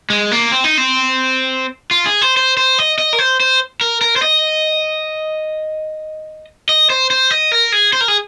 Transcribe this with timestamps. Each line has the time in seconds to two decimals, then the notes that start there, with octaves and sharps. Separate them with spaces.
0.10 G#3
0.31 A#3
0.51 C4
0.64 D#4
0.78 C4
1.91 F4
2.06 G#4
2.22 C5
2.37 C5
2.57 C5
2.79 D#5
2.98 D#5
3.13 A#4
3.19 C5
3.40 C5
3.81 A#4
4.01 A#4
4.16 C5
4.22 D#5
6.69 D#5
6.90 C5
7.11 C5
7.31 D#5
7.52 A#4
7.72 G#4
7.93 C5
8.01 A#4
8.08 G#4